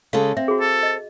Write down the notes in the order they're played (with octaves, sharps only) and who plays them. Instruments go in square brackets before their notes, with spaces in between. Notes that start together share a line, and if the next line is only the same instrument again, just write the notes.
[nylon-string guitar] C#3 G#3 A4 [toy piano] F5
[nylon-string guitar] C4 [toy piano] E5
[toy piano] F#4 G#4
[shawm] A4
[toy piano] D#5